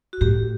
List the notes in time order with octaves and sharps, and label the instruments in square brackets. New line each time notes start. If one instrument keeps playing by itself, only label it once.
[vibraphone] F#4
[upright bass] A2 [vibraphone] G4